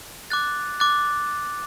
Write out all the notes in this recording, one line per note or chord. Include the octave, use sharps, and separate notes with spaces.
D6 F#6 A6
D6 F#6 A6